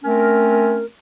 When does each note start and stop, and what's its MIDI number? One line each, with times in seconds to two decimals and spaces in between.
0.04 0.85 57
0.04 0.85 60
0.04 0.85 61
0.04 0.85 70